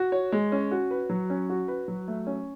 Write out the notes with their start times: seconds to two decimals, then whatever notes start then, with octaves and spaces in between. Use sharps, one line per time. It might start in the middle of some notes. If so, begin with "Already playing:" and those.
Already playing: F#4
0.12 C#5
0.32 G#3
0.52 C#4
0.71 F#4
0.91 B4
1.10 F#3
1.30 C#4
1.50 F#4
1.68 B4
1.88 F#3
2.08 A3
2.27 C#4